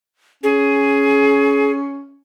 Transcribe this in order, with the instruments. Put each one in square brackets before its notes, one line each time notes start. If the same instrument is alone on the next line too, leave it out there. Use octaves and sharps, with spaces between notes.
[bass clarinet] C#4 [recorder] G#4